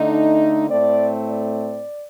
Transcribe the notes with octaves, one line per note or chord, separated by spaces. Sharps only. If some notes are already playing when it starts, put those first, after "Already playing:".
Already playing: D3 A3 D#4
A2 A3 C4 D5
D5